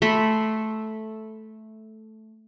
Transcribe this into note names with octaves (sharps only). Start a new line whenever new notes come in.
A3 E5 B5 C6